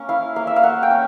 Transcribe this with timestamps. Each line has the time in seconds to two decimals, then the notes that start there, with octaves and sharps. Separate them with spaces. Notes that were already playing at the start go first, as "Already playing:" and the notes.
Already playing: A#3 C#4
0.09 E4 F5
0.36 A#3 F5
0.47 E5
0.56 F5
0.63 A#3 F#5
0.83 G5
0.91 C#4